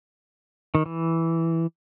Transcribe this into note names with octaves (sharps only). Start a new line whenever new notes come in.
D#3
E3